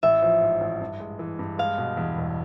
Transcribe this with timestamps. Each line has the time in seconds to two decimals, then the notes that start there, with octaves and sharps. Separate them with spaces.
0.03 A1 E5
0.22 F3
0.42 G#2
0.61 A1
0.80 G2
1.00 G#3
1.19 E3
1.39 G2
1.58 G#3 F5
1.78 B2
1.97 E2
2.17 E1